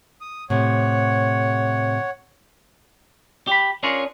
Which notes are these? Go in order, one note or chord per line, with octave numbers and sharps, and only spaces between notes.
D#6
A2 C3 C#5 F#5
G4 B5
C#4 D4 F4 G#4 A#4 C#5